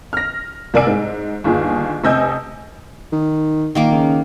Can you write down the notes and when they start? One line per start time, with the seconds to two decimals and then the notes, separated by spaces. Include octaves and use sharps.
0.13 F6 A#6
0.74 C2 A#4 D5 G#5 E6 D7
0.87 G#2
1.44 G1 D#2 F4 G#4
2.04 F1 C3 D#5 G#5 E6 G6
3.13 D#3
3.75 A#2 D#3 A#3 D6
3.92 C#3